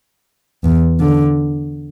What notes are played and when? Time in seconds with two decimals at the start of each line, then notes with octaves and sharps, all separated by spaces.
0.64 E2
1.00 D3